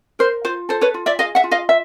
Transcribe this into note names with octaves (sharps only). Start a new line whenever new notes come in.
A#4 C5
F4 C5
A4 C5
B4 C#5
F4
D5 E5
G#4 D#5 F5
E5 F#5
F4
D#5 F5
E5